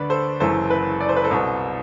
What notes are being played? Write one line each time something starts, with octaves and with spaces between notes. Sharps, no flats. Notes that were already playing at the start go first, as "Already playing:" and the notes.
Already playing: D2 D3 B4 D5
A4 C5
F#1 F#2 E3 A4 C5
B4
D5
C5
B4
A4 C5
C2 B2